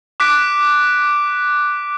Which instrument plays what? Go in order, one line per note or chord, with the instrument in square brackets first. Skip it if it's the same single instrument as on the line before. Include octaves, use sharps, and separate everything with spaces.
[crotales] D6 F#6 B6 D7